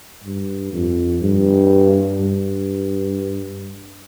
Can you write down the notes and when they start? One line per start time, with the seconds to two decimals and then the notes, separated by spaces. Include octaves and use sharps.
0.24 G2
0.73 F2
1.22 G2
2.20 G2